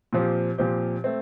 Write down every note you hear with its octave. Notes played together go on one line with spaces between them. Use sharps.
A#2 F3 C4 G4
A#2 F3 C4 G4
A3 C4